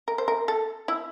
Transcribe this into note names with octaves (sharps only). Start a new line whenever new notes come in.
A#4
C5
A#4
A4
E4